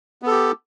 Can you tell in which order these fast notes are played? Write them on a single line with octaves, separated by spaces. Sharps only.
B3 A4 G4